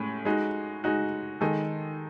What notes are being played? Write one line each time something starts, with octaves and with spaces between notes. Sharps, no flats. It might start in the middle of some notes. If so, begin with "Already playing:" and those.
Already playing: A2 G#3 C#4
G#3 D#4 F#4
G#3 D#4 F#4
D#3 G#3 D#4 A4